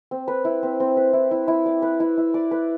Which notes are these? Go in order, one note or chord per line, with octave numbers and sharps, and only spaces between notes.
C4
B4
E4
C4
C4
B4
E4
E4
E4
D5
B4
E4
E4
D5
B4